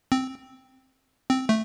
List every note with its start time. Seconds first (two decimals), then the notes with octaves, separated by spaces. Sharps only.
0.12 C4
1.29 C4
1.49 A3